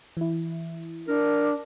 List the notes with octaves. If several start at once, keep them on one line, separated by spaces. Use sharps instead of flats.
E3 E4
D4 A#4